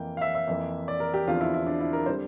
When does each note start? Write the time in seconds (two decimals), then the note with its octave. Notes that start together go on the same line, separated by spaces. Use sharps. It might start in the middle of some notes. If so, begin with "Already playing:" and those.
Already playing: F2 E3 A#3 G5
0.17 F5
0.21 E5
0.35 E5
0.47 F2 E3 A#3
0.88 D5
1.00 A#4
1.14 G4
1.27 E2 D3 F3 C4 F4
1.41 E4
1.54 E4
1.66 D4
1.81 E4
1.93 A#4
2.06 D3 G3 C4 C5